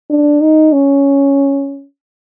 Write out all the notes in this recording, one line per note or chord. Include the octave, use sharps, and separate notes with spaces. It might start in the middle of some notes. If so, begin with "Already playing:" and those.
D4
D#4
C#4